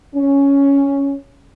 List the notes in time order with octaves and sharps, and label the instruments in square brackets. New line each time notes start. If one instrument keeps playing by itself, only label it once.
[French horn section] C#4